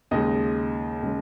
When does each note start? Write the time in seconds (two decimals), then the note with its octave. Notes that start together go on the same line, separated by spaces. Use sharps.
0.11 D#2 C#3 G#3 D#5
1.03 C#3 G#3